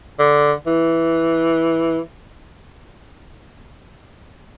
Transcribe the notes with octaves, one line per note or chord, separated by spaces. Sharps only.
D3
E3